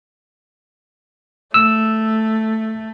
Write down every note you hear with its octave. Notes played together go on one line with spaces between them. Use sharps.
A3 E6